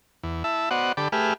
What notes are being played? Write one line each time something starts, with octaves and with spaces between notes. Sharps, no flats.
E2
E4 E5 A5
B3 F#4 C5 D5 D#5 F#5
D3 G4 A4 B5 D6
A3 G4 G#4 B4 E5 F6